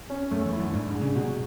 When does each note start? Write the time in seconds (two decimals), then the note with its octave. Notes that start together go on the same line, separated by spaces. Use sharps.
0.10 C#4
0.31 F#2 A3
0.45 E2
0.53 E4
0.59 F#2
0.73 G#2 D4
0.88 G#2
0.95 G#4
1.01 C#3
1.16 B2 F#3